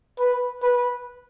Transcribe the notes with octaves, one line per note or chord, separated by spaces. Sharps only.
B4
B4